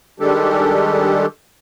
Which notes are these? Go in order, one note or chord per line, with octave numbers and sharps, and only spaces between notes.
D#3 G3 G#3 D4 G4 A4